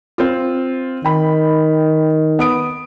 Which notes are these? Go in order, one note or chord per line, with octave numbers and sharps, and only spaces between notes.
C4 F4
D#3 G5 B5
B3 D#6 D7